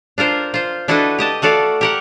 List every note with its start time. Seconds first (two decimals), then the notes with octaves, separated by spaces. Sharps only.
0.18 D4 F4 A#4 C5
0.54 F4 C5
0.88 D4 E4 F#4 A4 B4 D#5
1.19 G4 D#5 A5
1.42 A3 F#4 A4 D5 F5
1.81 G4 A#4 F#5